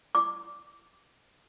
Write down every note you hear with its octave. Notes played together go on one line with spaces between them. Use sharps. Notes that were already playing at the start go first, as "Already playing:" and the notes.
D6